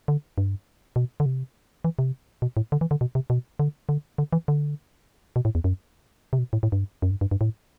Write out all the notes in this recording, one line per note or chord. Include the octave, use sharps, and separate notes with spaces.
D3
G2
B2
D3
C3
E3
C3
B2
A2
D3
E3
D3
B2
C3
B2
D3
D3
D3
E3
D3
B2
A2
E2
F#2
C3
B2
A2
A2
G2
F#2
G2
G2
G2
A2